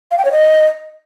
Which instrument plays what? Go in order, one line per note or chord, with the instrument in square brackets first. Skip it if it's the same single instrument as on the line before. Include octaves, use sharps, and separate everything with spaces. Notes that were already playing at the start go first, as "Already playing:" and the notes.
[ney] F5
G5
C#5
D#5